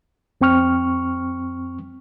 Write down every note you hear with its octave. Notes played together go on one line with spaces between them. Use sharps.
F2 C4 G5 C#6 F6